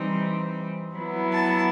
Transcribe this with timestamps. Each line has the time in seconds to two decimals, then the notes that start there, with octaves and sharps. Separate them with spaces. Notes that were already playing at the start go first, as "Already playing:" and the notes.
Already playing: E3 G3 C4 D#4
0.94 F#3 B3 E4
1.32 A5